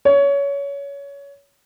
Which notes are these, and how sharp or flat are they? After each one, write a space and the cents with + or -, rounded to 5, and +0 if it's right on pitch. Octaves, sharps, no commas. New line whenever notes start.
C#5 +20